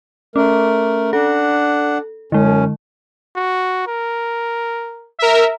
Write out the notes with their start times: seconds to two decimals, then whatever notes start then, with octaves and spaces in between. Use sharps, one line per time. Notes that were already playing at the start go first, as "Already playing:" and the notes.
0.36 A3 C#4 A#4
1.13 D4 A4 F#5
2.32 F#2 D3 G#3 C#4
3.36 F#4
3.88 A#4
5.19 A#4 E5